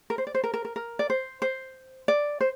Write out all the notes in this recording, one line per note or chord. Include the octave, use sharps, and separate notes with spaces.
A#4
C5
D5
C5
A#4
A#4
A#4
A#4
D5
C5
C5
D5
C5